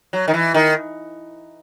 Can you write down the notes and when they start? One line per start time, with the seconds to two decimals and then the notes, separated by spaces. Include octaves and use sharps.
0.13 F#3
0.28 D#3
0.34 E3
0.54 D#3